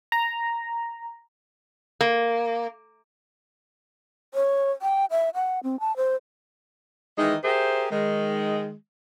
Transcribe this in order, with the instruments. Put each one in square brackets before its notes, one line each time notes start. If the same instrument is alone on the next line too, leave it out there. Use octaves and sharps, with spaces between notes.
[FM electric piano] A#5
[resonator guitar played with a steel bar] A#3
[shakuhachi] C#5
G5
E5
F#5
C4
A5
C5
[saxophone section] D#3 E3 G#3 D#4
G4 G#4 A#4 C5 E5
D#3 G#3